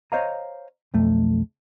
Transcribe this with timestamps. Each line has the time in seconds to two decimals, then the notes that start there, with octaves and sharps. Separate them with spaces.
0.12 C5 C#5 D#5 F5 G#5 A#5
0.94 B1 F2 A3